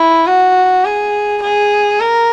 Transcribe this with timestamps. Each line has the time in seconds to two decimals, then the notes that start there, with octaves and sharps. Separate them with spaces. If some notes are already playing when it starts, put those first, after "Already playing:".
Already playing: E4
0.26 F#4
0.85 G#4
1.42 G#4
2.00 A#4